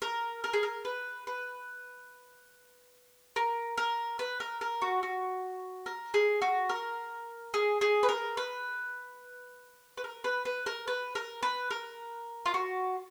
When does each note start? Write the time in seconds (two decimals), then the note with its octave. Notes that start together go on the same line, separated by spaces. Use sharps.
0.02 A#4
0.44 A#4
0.53 G#4
0.63 A#4
0.85 B4
1.27 B4
3.36 A#4
3.77 A#4
4.19 B4
4.40 A#4
4.61 A#4
4.82 F#4
5.03 F#4
5.86 A#4
6.14 G#4
6.42 F#4
6.69 A#4
7.54 G#4
7.81 G#4
8.03 B4
8.09 A#4
8.37 B4
9.97 B4
10.04 A#4
10.24 B4
10.45 B4
10.66 A#4
10.88 B4
11.15 A#4
11.43 B4
11.71 A#4
12.46 F4
12.54 F#4